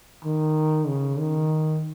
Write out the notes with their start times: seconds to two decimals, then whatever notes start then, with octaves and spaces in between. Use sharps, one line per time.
0.25 D#3
0.87 C#3
1.19 D#3